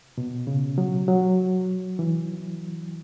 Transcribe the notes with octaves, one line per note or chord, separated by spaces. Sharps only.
B2
C#3
F#3
F#3
E3